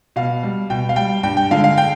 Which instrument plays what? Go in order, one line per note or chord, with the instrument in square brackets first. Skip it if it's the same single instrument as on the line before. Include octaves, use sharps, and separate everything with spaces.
[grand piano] B2 F5
G3
B2 G5
F5
G3 G5
G2 G5
G5
D3 G#3 F5
F5
G5